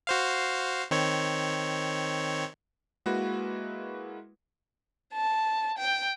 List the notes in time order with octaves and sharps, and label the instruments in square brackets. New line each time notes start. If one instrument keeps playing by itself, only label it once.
[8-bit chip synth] F#4 C5 F5
D#3 C4 C#5
[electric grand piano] G#3 A#3 E4 F#4 B4
[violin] A5
G5